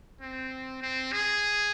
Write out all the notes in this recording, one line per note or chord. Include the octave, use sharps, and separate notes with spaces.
C4
C4
G#4